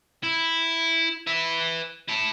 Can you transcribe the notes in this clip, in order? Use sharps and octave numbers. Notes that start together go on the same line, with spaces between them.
E4
B4 E5
E4 A5